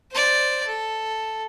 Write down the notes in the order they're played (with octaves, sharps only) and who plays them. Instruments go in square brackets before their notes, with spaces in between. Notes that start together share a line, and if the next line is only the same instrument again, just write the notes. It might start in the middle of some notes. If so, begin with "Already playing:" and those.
[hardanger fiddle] C5 D5
A4